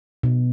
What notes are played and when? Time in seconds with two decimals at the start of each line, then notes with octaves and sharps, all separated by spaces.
0.23 B2